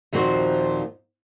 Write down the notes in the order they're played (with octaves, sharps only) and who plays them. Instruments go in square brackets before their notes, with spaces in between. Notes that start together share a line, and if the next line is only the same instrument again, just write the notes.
[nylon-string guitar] D#2 A#2 F3 C4 F#4 C5